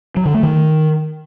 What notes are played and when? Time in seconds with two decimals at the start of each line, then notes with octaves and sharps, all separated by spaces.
0.17 F#3
0.25 D3
0.34 A3
0.43 D#3